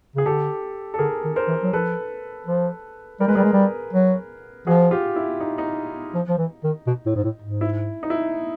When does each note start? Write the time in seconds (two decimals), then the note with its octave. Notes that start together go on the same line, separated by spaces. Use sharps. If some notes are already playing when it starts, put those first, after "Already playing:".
0.15 C#3 G#4
0.26 D3 G4 A4
0.94 A4
0.99 D3 G#4 A#4
1.24 D#3
1.36 A#4 C5
1.48 E3
1.63 F#3
1.73 F3 A4 B4
2.47 F3
3.20 G3 A#4
3.28 G#3 B4
3.35 G3 G#4 A#4
3.44 G#3
3.53 G3
3.93 F#3
4.67 F3 F#4 G#4
4.91 F4 G4
5.16 E4
5.40 D#4
5.58 D#4
6.14 F3
6.29 F3
6.38 E3
6.64 D#3
6.87 B2
7.06 A2
7.15 G#2
7.24 A2
7.42 G#2
7.61 E4
8.03 D#4
8.10 E4